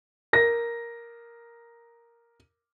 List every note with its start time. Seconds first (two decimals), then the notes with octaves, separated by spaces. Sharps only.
0.33 A#4 A#6